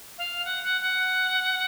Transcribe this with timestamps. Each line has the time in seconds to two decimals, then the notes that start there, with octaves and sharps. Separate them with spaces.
0.18 F5
0.45 F#5
0.63 F#5
0.81 F#5